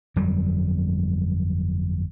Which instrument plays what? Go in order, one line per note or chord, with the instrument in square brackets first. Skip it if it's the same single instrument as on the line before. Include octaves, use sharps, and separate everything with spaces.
[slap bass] G1 F2 F#3 G3